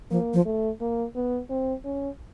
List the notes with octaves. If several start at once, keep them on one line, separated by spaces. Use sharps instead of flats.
F3 A#3
F3
A3
A#3
B3
C4
C#4